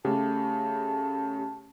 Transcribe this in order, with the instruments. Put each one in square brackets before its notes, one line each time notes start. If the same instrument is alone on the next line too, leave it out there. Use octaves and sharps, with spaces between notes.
[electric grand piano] C#3 A3 [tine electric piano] G4 [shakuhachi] A5